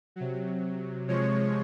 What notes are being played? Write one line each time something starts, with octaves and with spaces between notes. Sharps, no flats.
C3 F#3
C3 F3 G#3 C#5